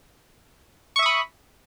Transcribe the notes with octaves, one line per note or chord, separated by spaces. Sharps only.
E5 B5 C#6 D#6